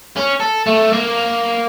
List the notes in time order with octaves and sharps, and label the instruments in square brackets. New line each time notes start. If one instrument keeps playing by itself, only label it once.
[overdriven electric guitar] C#4
A4
A3
A#3